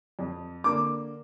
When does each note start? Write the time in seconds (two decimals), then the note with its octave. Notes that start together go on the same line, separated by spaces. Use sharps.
0.19 F2
0.64 D3 A#3 D6